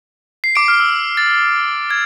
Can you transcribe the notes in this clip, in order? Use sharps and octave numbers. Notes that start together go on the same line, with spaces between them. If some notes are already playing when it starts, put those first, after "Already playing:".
C7
D6 D7
F6
E6
A6
G#6